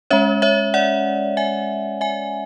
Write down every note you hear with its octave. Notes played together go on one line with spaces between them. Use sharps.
G#3 C#4 C#5 E5
C#5 E5
D5 F#5
E5 G#5
E5 G#5